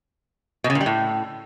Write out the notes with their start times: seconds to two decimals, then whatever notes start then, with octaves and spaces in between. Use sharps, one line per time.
0.64 B2
0.70 C#3
0.75 A#2
0.81 G3
0.86 A2